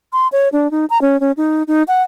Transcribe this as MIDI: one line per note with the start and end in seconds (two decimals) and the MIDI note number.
0.13 0.28 84
0.32 0.49 73
0.52 0.70 62
0.71 0.86 63
0.90 1.00 82
1.02 1.20 61
1.20 1.32 61
1.37 1.63 63
1.68 1.83 63
1.88 2.03 78